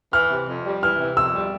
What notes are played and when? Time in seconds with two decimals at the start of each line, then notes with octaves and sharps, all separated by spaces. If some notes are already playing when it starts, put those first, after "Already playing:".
0.13 E3 F6
0.31 C3
0.48 F2
0.66 G3
0.83 E3 F6
1.00 C3
1.16 F2 E6
1.35 G3